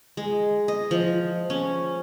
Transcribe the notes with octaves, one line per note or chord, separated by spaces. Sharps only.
G#3
D#5
F3
C#4